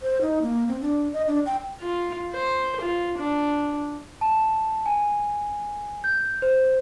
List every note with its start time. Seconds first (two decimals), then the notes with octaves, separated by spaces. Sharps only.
0.02 C5
0.21 D#4
0.42 A#3
0.68 C4
0.81 D4
1.13 D#5
1.27 D4
1.46 G5
1.80 F4
2.33 C5
2.80 F4
3.18 D4
4.21 A5
4.86 G#5
6.04 G6
6.42 C5